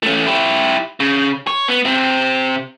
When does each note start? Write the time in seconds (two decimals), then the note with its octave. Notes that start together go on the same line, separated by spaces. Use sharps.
0.03 A3 C#4
0.26 E4 G4
1.00 C#3
1.47 C#5
1.68 B3
1.85 C3 C4